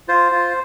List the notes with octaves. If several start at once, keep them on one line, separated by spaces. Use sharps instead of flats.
F4 C5
F4